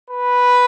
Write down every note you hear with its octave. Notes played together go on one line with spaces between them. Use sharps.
B4